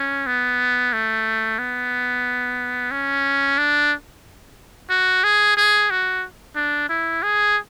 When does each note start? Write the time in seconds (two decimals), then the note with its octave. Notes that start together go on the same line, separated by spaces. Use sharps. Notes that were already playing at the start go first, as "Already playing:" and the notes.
Already playing: C#4
0.27 B3
0.93 A3
1.59 B3
2.91 C#4
3.58 D4
4.90 F#4
5.24 G#4
5.57 G#4
5.90 F#4
6.56 D4
6.89 E4
7.23 G#4